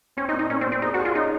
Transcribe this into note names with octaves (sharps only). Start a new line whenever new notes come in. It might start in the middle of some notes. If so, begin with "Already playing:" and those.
C4 C#4
D#4
A#2
D#4
A#2 C#4
C4
A#2
C4
D#4 G#4
F#4
G#4
F4
C#4 D#4